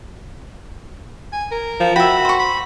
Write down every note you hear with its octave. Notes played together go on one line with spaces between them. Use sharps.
G#5
A#4
F3
F#4 E5 G5 B5
C5 C#6
B5